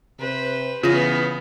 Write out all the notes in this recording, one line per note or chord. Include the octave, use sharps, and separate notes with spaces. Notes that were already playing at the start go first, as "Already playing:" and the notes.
C3 B4 C5
C#3 E3 B3 F4 A#6 D#7